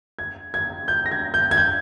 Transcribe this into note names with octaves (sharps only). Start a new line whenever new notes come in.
G#6
G#6
G6
A#6
G#6
G6
G#6
G6